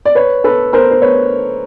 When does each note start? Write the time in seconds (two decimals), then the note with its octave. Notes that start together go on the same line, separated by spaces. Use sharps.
0.05 D5
0.15 B4 C#5
0.44 A4 B4
0.73 A#4 C5
0.91 C5
1.02 B4 C#5